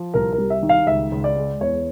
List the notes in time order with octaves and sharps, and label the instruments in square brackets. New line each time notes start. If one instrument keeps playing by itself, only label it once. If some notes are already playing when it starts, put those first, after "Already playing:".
Already playing: [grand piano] F3
[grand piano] C2 [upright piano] A#4
[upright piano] A#4
[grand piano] G3
[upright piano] E5
[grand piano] D#3
[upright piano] F5
[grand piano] C#2 [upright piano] E5
[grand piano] C#2
[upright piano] D5
[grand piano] G#3
[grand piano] E2 [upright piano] C#5